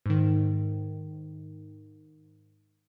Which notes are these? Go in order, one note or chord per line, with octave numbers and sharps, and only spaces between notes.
G#2 D#3